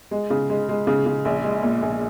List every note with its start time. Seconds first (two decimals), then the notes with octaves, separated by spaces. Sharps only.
0.11 G#3
0.30 C#3
0.50 G#3
0.69 G#3
0.87 C#3
1.06 C#3
1.25 A#1
1.44 G#3
1.63 A#2
1.82 A#1